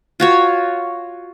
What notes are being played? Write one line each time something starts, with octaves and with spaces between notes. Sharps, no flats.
F4 F#4 C#5